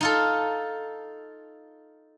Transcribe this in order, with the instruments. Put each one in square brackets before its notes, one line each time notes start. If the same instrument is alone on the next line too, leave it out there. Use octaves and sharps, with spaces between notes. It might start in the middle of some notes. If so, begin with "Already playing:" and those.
[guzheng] D#4 F4 A4